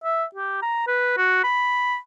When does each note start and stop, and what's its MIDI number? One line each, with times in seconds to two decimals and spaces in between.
0.04 0.24 76
0.35 0.61 67
0.62 0.85 82
0.87 1.14 71
1.17 1.44 66
1.44 1.98 83